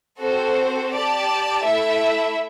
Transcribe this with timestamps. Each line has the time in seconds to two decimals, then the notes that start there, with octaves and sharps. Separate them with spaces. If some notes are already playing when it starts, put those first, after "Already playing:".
0.20 C4 F#4 A4 C5
0.92 G4 D5 A5
1.64 A3 E4 A4 E5